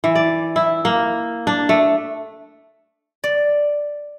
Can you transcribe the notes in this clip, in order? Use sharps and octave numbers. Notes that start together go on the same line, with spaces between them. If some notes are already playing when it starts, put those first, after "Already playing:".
E3
D5
E4
A#3
D4
A3
D5